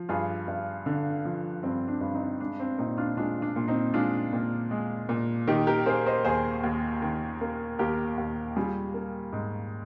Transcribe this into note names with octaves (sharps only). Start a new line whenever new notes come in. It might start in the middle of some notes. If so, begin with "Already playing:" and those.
Already playing: F3
G2 F4 G#4
G2
D3
F3
G2 C4
D4
G2
C4 D#4
G#3 D4
C4
A#2 C4 D#4
D4 F4
G#3 D4 F4
D4
A#2
C4 D#4
G#3 D4 F4
A#2
G#3
A#2
D#3 D#4 G4
G4 A#4
A#3 G#4 C5
C5 D#5
D#2 G#4 C5
D#2
D#3
A#3
D#2 G4 A#4
D#2
G3 F4 G#4
A#3
G#2